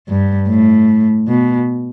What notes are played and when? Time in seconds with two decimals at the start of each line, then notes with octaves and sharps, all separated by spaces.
0.08 G2
0.48 A2
1.28 B2